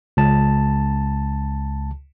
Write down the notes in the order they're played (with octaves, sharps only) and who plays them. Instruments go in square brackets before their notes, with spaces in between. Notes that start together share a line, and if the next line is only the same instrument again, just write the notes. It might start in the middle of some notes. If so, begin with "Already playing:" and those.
[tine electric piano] C#2 A5